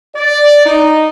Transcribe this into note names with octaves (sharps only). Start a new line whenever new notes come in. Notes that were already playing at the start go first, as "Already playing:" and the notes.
D5
D#4